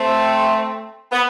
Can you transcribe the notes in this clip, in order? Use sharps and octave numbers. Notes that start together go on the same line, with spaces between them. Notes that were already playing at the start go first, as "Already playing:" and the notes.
Already playing: A3 C4
B3